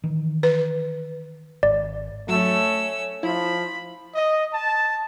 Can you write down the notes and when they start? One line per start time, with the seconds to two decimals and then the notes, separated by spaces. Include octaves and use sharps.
0.04 D#3 E3
0.43 B4
1.63 G#1 D5
2.28 F#3 A3 C#4 E6
3.23 F3 E4 B5
4.15 D#5
4.54 A5